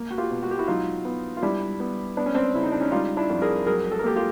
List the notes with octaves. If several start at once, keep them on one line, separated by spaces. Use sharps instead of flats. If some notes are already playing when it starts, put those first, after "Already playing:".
Already playing: A#3
F#4
F4 G4
B2
F#4
G4
E4 F#4
F#3 D#4 F4
B3
F4
G3 D4 E4
B3
B3 D4
C#4
C4 D4
C#3 E4
D#4
D4
C#4 D#4
G3 D#4 F4
D4 E4
F2
G#4 A#4
F#3 G#4 A#4
A4
A#4
A#3 G4 A4
F4 G4